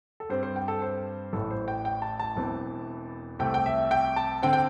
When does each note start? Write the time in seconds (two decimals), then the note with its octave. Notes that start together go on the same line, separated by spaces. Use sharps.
0.20 A4
0.29 G2 G3 C4 C5
0.43 C5
0.56 G5
0.68 A4
0.82 C5
1.33 A1 A2 E3 A4
1.51 C5
1.68 G5
1.85 G5
2.02 A5
2.20 A5
2.36 E1 E2 E3 C4
3.39 C2 C3 A3 C4 G5
3.54 G5
3.66 E5
3.91 G5
4.16 A5
4.42 D3 C4 G5
4.53 G5